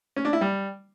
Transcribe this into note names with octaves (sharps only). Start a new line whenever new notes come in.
C#4
D4
E4
G3